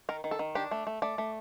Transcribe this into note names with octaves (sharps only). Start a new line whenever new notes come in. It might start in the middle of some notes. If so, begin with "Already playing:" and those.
D#3 A#4
D#3
A4
D#3
D4 G4
A3
A3
A3 D5
A3